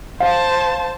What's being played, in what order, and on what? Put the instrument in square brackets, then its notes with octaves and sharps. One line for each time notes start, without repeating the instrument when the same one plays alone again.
[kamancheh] C5 A5 [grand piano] F5